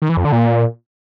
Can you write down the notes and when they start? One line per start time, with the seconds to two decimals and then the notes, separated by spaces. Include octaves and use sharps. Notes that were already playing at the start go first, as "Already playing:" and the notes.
0.02 D#3
0.09 E3
0.17 F2
0.25 D3
0.32 A#2